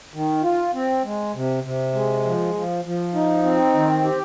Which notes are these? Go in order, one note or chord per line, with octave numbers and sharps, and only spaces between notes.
D#3
F4
C4
G#3
C3
C3
G#3
F3
F3
F3
D#4
C4
D#3
G4